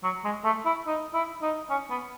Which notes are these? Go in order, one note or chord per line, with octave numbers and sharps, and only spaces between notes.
F#3
G#3
A3
E4
D#4
E4
D#4
C#4
B3